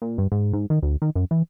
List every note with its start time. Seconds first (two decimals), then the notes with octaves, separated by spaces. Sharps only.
0.02 A#2
0.18 G2
0.32 G#2
0.53 G#2
0.70 D#3
0.82 D2
1.02 D#3
1.15 F#2
1.31 E3